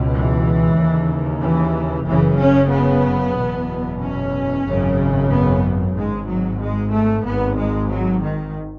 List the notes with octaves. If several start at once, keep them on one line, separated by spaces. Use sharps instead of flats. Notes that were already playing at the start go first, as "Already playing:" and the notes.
Already playing: C#2 B2
E3
D#2 C#3
E3
F#1 F#2 C#3 E3
C#4
B3
F#1 E2 B2
C#4
G#1 F#2 C#3
B3
G#1 G#2 G#3
F#3
G#3
A3
G#1 G#2 B3
G#3
F#3
D#3